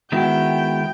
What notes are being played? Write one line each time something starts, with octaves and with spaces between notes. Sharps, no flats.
D#3 G#3 B3 E4 F#4 F#5 G5